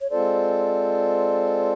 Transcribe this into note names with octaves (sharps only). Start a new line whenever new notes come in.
C#5
G#3 C4 F4 A4 C5 D5